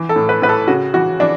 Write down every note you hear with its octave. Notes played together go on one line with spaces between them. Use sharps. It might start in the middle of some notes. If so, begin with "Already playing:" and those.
Already playing: E3
A4
A2
B4
A2 B4
A4
C#3 F#4
E3 F#4
E3 D4